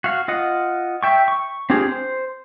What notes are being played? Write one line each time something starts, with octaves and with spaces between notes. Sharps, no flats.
F#4 F5
F4 D#5 F#5
E5 G5 C#6
C#6
C4 D4 F4 G4 G#4
C5